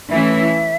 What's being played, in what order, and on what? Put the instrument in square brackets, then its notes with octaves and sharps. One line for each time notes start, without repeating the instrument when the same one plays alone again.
[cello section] E3 A3 C#4 E4 [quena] E5